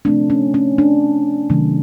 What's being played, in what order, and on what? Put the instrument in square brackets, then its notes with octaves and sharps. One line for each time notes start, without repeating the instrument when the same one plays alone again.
[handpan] C3 F3 A3 C4 D4
C#4
C#4
D4
C3 D#3 F#3 A3